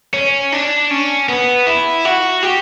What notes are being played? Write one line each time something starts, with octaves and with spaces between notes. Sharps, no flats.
C#4
D4
C#4
B3
E4
F#4
G4